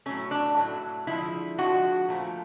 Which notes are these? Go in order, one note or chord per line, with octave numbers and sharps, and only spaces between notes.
A2 F#3 A3 C#4
D4
A2 F#3 A3
D3 F3 G#3 E4
D3 F3 G#3 F#4
A#2 F3 A3